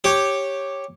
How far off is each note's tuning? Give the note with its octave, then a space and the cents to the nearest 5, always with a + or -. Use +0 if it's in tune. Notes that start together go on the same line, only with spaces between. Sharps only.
G4 +0 C#5 -10